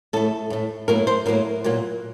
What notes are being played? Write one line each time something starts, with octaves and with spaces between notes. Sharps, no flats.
A2 A3 A4
A2 A3
A2 F#3 A#3 A#4
C5
A2 F#3 A#3 A#4
A#2 F#3 A#3